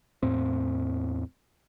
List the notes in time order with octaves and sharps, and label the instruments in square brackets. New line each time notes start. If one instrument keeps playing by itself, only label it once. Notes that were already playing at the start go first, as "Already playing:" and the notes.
[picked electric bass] E2 A2 C4